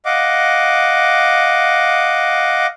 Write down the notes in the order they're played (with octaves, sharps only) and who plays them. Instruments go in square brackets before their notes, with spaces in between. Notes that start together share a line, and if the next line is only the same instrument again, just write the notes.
[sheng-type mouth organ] D#5 F5 F#5 D6